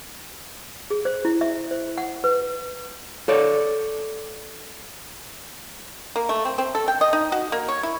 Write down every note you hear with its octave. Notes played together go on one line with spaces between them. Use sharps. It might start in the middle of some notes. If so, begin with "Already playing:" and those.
G#4
C5
E4
E5
C5
F#5
B4
A4 C#5 D5
A#3
A3
C4
C4
A4
G5
D#5
D#4
F#4
A#3
C#5
E4